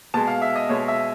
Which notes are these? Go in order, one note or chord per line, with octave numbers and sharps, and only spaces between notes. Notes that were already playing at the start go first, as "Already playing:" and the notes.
B2 G#3 A5
F5
E5
D#5
B2 G#3 C#5
E5